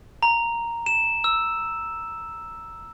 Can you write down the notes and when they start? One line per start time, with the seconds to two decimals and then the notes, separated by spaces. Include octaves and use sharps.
0.23 A#5
0.86 E7
1.24 E6